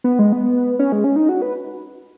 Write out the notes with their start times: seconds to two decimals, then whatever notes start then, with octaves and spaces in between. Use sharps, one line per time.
0.04 B3
0.19 G#3
0.32 B3
0.79 C#4
0.92 G#3
1.04 C#4
1.16 D#4
1.29 F#4
1.42 B4